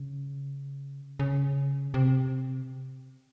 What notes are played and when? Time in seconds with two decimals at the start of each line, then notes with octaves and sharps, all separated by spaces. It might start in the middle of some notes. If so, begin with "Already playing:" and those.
Already playing: C#3
1.19 C#3
1.94 C3